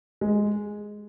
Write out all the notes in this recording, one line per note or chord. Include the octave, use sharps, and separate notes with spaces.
G#3